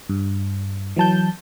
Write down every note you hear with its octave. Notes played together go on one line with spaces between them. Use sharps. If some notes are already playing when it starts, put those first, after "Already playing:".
G2
E3 F#3 A5 G6